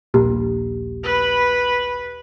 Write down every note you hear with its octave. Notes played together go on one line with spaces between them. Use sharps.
D#1 A#1 A#3 G4
B4 B5